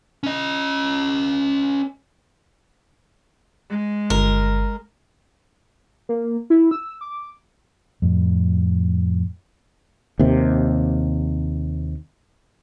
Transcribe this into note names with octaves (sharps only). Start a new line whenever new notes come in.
C#4 D#5
G#3
G1 A#4
A#3
E4
E6
D6
F2 A2
D#2 C3